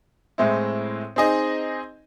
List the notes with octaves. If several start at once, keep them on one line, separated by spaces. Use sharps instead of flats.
A2 G#3 C4 E4
C4 D#4 G#4 D#5